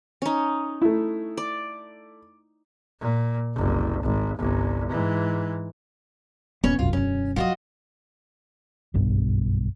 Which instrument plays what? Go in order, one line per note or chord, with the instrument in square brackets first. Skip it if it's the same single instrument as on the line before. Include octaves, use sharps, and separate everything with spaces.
[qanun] C#4 D#4
[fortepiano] A3 E4
[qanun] D5
[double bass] A#2
F#1 C2
G#1
G1 C2
G#2 E3
[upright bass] D#1 D4 [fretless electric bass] B3 [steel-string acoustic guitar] C#4 C#5
[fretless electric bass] E1 F#2 [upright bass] C2 [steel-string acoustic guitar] F4
[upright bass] E2 D3 [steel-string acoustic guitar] C#4
[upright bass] F3 F#3 [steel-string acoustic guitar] F4 F#4 D#5
[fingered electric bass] F#1 B1 G2 B2